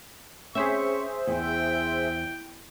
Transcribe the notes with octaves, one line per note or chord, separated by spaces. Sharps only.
C4 C#4 G#4 C5 E5 C#6
E2 G5